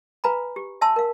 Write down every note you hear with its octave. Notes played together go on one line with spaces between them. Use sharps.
B4 F5 G#5 A#5 B5
G4
E5 G#5 A5 C6 E6
A#4 F5